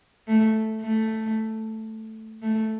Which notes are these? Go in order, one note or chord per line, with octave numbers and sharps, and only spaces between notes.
A3
A3
A3